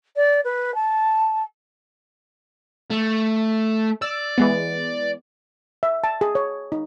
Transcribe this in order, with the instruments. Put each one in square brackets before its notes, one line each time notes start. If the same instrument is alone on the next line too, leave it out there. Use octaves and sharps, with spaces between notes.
[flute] D5
B4
A5
[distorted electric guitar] A3
[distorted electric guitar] D5 [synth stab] E6
[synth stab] E3 G#3 B3
[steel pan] E5
A5
G#4
C#5
D#4